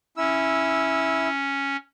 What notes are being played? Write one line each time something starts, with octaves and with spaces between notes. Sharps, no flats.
C#4 E4 E6